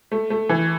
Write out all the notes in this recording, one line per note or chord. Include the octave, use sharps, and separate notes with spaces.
A3
A3
E3